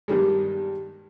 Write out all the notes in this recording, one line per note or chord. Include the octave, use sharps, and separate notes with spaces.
G2 D#3 G3 G#3